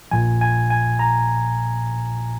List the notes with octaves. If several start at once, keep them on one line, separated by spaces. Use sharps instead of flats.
A#1 A#2 F3 G#5
G#5
G#5
A#5